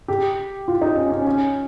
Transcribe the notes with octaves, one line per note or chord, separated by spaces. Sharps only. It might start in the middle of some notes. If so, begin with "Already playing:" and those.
G4
F4
D#4
C#4
C#4
C#4